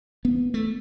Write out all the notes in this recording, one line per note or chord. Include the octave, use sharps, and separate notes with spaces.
B3
A3